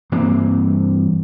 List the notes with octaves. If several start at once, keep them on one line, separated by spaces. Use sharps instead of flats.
G2 E3 A#3 C4